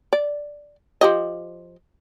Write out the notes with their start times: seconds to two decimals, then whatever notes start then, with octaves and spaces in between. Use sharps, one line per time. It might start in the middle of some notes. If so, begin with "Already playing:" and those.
0.13 D5
1.01 F3 G4 D#5